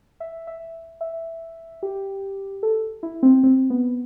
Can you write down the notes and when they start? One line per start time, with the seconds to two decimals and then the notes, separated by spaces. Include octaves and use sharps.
0.20 E5
0.47 E5
1.01 E5
1.83 G4
2.63 A4
3.03 E4
3.23 C4
3.43 C4
3.70 B3